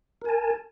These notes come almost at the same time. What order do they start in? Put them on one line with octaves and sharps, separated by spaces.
A#4 G#5 A5